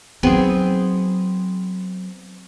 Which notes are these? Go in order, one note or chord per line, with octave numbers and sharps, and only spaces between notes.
F#3 B3 C4 D#4 G#4